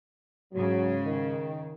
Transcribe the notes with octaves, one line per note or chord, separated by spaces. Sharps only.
G#2 C#3 F#3
D#3